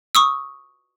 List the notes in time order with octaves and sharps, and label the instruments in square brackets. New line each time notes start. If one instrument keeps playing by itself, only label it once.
[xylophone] C#6 D#6 E6